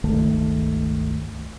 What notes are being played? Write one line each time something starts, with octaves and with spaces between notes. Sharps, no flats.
G1 C#2 D#3 A3